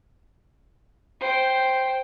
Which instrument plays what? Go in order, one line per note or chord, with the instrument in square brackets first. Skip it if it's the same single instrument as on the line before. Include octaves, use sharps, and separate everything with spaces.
[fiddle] C5 G5